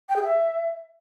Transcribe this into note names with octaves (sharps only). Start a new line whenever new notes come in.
G5
G#4
E5